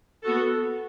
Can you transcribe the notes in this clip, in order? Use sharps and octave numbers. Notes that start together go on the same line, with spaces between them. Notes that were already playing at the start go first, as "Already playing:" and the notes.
B3 F#4 A4